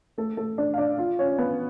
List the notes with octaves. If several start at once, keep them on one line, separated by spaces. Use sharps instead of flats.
A3 A4
A3 A4
D4 D5
F5
D4 D5
F4 F5
C#4 C#5
B3 B4